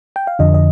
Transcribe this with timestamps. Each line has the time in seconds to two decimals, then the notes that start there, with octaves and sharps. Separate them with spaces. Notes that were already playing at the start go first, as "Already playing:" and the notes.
0.16 G5
0.27 F5
0.39 F2 D3 F3 D#5
0.54 D#5